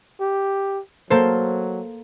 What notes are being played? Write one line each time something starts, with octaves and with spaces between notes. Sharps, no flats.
G4
F#3 A#3 A4 C5